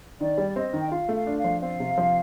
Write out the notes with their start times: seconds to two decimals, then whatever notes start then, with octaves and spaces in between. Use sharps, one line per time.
0.21 D#3 D5
0.38 G3
0.56 C4 D#5
0.73 D#3
0.79 G5
0.91 F4 F5
1.09 A3
1.15 F5
1.27 D4
1.38 F5
1.44 F3
1.62 C4 F5
1.80 C3
1.98 F3